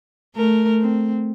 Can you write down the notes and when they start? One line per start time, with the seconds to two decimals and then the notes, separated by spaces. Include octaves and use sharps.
0.35 A3 A#4
0.81 C4